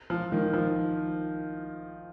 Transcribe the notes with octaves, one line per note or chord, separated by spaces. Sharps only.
F3
D#3
F3